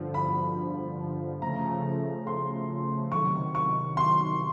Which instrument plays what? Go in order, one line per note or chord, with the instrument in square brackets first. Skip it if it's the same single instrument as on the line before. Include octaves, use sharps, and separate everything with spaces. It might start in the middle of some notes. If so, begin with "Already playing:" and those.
Already playing: [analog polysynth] G2 D3 F3
[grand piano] B5
[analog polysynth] C#3 F3 A3 [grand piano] A#5
[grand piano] C6
[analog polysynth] C3 D#3 F#3 [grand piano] C#6
[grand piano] C#6
C6